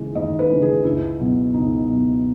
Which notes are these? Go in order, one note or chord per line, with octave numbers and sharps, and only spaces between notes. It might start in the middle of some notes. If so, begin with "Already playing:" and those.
Already playing: D#2 C#3 E3 G#3
D#2 D#5
B4
C#3 E3 G#3
G#4
C#2 E4
B2 F#3
C#2 D#4
B2 F#3